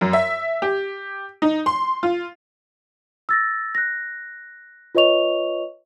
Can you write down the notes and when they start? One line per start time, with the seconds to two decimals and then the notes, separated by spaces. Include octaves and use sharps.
0.01 F#2
0.13 E5
0.62 G4
1.42 D#4
1.66 C6
2.03 F4
3.29 E6 A6 A#6
3.75 F#6 A#6
4.95 F4 B4 C#5 D#5 C#6 F7